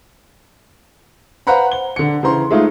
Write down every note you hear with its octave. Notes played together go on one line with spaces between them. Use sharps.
B4 C5 F5 F#5 A#5 B5
G7
D3 C#7
C#3 E3 C5 A#5 C6
G#3 A3 D#4 F4